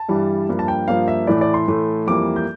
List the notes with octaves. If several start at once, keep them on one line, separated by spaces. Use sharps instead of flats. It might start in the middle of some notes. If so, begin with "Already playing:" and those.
Already playing: A5
G2 E3 G3
G2 F3 A#3
A5
G5
G2 F3 A#3 F5
E5
A2 E3 A3 D5
D5
C6
A2 E3 A3
F2 E3 G3 A#3 D6
G6